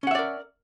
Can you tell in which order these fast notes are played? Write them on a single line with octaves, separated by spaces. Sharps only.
C#4 F#5 E5 D5 A#4